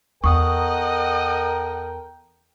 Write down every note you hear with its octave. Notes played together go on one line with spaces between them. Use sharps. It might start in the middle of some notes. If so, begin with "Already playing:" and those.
E2 A4 A#4 D#5 F#5 G5 C#6 D#6